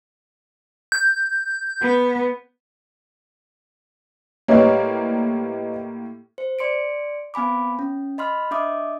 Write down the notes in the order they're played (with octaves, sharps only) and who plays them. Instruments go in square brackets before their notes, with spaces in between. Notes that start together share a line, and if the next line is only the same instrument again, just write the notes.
[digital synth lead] G6
[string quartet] B3
[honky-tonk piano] A2 G3 A#3 [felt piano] B4 C#5 D#5
[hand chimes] C5
D5 C6 C#7 D7
B3 C4 G#5 B5 D6
C#4
D#5 B5 C6 F6
D4 D#5 E5 D6 D#6